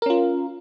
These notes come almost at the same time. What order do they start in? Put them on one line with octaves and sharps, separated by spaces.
A#4 C#4 F4